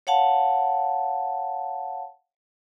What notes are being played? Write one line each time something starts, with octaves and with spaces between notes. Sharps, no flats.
C#5 F5 F#5 A5